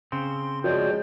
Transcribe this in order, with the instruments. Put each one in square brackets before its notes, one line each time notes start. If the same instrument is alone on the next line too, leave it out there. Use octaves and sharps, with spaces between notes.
[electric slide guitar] C#3 C4 [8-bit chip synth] C6
[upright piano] F3 G#3 [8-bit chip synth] F#4 C#5 D5 [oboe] G5